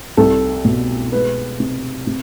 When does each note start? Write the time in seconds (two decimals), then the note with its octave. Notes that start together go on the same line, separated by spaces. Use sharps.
0.17 C2 A4
0.65 B2
1.12 G#3 B4
1.60 C3
2.07 C3